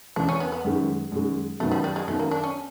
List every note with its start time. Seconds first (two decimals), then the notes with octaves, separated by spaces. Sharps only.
0.16 E2 C#3 E3 D4
0.29 C#4
0.40 B3
0.52 B3
0.65 F#2 D#3 G#3
1.12 F#2 D#3 G#3
1.60 F#2 D#3 F#3 A3 B3
1.72 G3
1.84 G3
1.96 G#3
2.08 F#2 D#3 F#3 A3 B3
2.19 A#3
2.31 D4
2.44 C#4